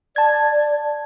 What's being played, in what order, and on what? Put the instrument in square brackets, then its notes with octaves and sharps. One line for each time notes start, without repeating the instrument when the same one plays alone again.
[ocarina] D5 [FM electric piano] A5 G#6